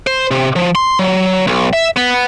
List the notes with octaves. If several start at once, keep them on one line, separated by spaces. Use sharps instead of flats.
C5
C3
F3
C6
F#3
B1
E5
B3